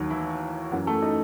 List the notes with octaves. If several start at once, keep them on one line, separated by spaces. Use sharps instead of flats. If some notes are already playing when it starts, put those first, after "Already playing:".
Already playing: D#2 D#3 F#3
E3 E4
F#2 E3 F#3 F#4
A3 A4
D#4 D#5